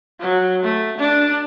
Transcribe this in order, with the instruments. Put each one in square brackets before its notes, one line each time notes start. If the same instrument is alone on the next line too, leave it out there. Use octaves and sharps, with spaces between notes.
[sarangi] F#3
A3
D4